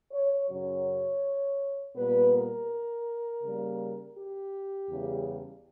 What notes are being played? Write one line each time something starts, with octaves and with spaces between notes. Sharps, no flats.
C#5
F#2 C#3 F#3 C#4 C#5
A#2 G3 B3 B4
A#4
C#3 G3 A#3
G4
E2 C#3 G3